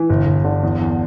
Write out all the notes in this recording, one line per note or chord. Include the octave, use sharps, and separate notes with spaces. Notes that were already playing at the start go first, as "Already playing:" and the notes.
Already playing: E3
G1
G1
D3
E2
E2